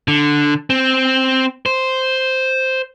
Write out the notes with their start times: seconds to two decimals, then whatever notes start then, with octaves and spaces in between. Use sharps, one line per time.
0.08 D3
0.70 C4
1.66 C5